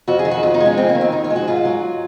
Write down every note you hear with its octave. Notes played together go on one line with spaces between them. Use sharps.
F2 F#4
G#4
D#3
F#4
F2 F4
D#4
G#3
C#4
F2 C4
A#3
D#3
C4
F2 D#4
F4
G#3
F#4
G#2 F4
F#3